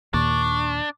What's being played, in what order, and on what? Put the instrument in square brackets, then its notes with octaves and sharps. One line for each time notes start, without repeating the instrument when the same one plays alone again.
[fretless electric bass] D#2 A#2 [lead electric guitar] D4 [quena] C#6